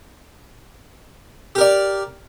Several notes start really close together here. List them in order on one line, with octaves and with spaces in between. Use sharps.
G4 A#4 D5